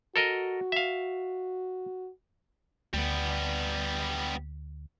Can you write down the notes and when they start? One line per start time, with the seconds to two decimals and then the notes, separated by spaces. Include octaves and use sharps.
0.16 F#4 A4 A#4 D#5
0.72 E5 F5
2.94 D2 G3 B3